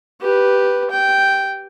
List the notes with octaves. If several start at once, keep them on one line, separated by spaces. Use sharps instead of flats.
G4 B4
G5